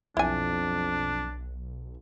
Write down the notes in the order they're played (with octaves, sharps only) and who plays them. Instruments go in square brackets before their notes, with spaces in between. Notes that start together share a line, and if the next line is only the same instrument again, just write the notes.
[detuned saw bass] B1 [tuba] F2 [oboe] D4 [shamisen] E4 G#5